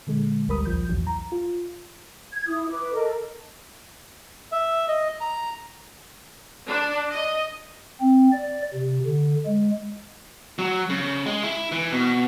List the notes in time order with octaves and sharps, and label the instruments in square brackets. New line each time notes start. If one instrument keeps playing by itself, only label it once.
[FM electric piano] A#2 D3 G#3
G#1 D2 G3 A#4 B5 D#6
A#1 D#2 F3 G6
B1 E2 A2 E3 F#3
A#5
F4
[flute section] G#6
E4 D#6
B4 D6
A4 A#4 D#5
[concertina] E5
D#5
A#5
[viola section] D4
D#5
[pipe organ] C4
D5
C3
D3
G#3
[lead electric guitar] F#3
C#3
G#3
E4
E3
B2